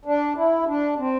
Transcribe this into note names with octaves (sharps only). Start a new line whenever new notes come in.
D4
E4
D4
C4